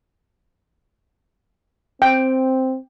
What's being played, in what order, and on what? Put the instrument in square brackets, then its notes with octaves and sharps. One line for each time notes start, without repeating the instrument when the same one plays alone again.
[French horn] C4 [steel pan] G5